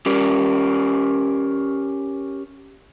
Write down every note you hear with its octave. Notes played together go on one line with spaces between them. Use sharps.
C#4 G4 A#4